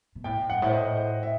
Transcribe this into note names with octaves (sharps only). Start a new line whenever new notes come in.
B2
A2 G5
G2 F#5
A2
C5
D#5
C5
E5